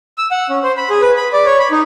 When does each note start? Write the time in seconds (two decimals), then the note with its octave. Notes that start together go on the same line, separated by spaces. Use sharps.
0.18 E6
0.31 F#5
0.50 C#4
0.63 C5
0.77 B5
0.90 G#4
1.02 B4
1.17 B5
1.33 D5
1.46 C#5
1.59 B5
1.71 D#4